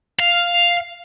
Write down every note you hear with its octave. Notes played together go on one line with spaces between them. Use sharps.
F5